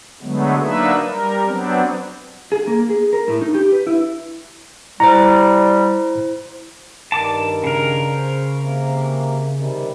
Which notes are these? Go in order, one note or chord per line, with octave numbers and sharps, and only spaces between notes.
D3 F#3 G#3 A3 B3
F#3 A#3 D4 D#4 B4 E5
G3 A#4
F#3 B3 C4 D4
G#4
A#3
G#4
A#4
A2
D#4
G4
B4
E4
G3 E4 C5 A#5
G2 D#3 A5 D6
C#3 A#4
C5
C3 A#3
C3 D#3 G3